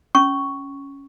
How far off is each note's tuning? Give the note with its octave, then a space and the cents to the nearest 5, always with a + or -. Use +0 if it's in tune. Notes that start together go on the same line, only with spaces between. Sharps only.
C#4 +0 C#6 +0